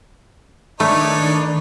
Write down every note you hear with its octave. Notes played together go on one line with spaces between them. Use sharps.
D#3 A3 D4 D#4 B4 C#5